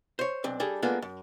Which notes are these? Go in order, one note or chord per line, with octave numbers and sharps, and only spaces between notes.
C5 C#5
B1 C4 D4
G3 D4 G#4 A4
G#3 A#3 B3 D4 F4 A4
F#2